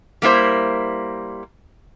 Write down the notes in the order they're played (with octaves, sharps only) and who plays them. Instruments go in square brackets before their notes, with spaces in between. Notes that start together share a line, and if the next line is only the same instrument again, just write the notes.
[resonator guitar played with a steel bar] G3 A#3 E4 C5